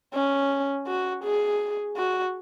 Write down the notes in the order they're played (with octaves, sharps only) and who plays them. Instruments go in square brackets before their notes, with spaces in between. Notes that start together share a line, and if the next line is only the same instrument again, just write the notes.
[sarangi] C#4
F#4
G#4
F#4